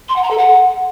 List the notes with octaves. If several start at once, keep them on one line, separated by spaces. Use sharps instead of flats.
C6
F#5
A#5
A4
F#5